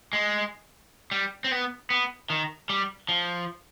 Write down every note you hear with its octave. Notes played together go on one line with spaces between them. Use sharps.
G#3
G3
C4
B3
B3
D#3
G3
F3